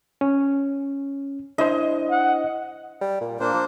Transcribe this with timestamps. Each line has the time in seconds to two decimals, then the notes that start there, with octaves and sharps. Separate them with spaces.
0.21 C#4
1.58 D4 E4 C5 D#5
2.10 F#5
3.01 G3
3.21 A#2
3.40 A#2 A#3 D4 C5
3.53 F3